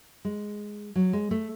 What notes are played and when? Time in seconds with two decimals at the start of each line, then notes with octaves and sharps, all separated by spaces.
0.25 G#3
0.95 F#3
1.13 G#3
1.31 A3